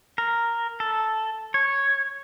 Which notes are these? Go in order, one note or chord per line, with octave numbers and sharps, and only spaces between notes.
A#4
A4
C#5